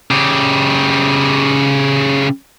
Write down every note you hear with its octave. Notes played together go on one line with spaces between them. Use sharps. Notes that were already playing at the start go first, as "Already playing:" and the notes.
C#3 G4